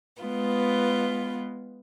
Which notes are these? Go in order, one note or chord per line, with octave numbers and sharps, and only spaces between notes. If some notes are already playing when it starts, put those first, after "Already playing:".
G#3 B3 F4 B4